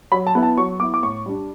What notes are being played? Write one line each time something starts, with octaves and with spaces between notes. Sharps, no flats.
F#3 B5
A5
B3 E4
A5
F#3 C#6
B3 E4 D6
D6
A2 C#6
G3 D4